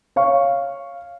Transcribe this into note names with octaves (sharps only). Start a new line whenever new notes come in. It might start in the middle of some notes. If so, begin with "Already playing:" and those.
C#5 F5 C#6